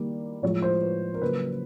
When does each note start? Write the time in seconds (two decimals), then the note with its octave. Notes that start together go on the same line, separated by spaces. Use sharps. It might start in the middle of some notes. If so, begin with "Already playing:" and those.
Already playing: D#3 G3 A#3
0.42 A2 F3 G#3 C#5
0.62 C5
0.82 B4
1.14 A#4
1.21 C#3 F#3 A#3 B4